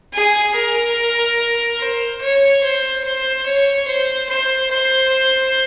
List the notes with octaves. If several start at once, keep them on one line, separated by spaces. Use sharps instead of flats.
G#4
A#4
C5
C#5
C5
C5
C#5
C5
C5
C5